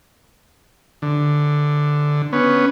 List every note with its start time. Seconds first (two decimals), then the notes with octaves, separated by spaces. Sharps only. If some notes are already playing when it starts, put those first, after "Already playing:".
1.02 D3
2.33 B3 C#4